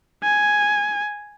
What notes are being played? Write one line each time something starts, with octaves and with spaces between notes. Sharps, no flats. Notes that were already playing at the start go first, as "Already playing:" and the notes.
G#5